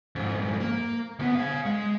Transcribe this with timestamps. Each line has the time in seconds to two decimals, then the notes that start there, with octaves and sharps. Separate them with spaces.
0.16 F2 G#2
0.60 A#3
1.19 D2 B3
1.35 C#5 F5
1.66 G#3